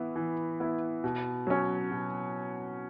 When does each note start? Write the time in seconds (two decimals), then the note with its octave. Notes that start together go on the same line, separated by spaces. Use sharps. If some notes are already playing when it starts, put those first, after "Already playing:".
Already playing: E3 B3 E4
0.16 E3
0.60 B3 E4
1.04 B2
1.47 F#3 C#4
1.91 B2